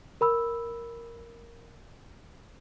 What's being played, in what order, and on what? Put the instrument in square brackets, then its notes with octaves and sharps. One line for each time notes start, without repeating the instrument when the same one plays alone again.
[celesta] A#4 B5 E6